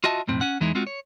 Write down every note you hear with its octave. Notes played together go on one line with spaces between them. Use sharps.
F4 F#4 D#5 E5 A5
B1 F2 A2 C4
C#4 F#5
E2 E3 G#3 D#4 E4
G#3 C4 F4 F#4
C#5